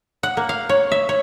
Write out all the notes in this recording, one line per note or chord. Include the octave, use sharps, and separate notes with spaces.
F#5
A#3
F5
C#5
E5
C#5